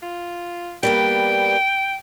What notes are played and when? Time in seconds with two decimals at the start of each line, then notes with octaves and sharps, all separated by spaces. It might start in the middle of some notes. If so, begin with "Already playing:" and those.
0.02 F4
0.83 G3 A#3 B3 G5